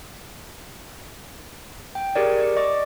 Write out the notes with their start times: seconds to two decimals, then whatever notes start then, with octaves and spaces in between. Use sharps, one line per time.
1.95 G5
2.15 G4 G#4 A#4 C#5 D5
2.40 D5 C#7
2.56 D5 D#5 C#6 D6